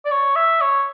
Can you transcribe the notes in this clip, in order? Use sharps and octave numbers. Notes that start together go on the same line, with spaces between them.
D5
C#5
E5
C#5